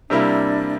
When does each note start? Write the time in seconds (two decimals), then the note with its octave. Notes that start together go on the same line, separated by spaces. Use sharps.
0.10 C3 G3 A#3 D4 E4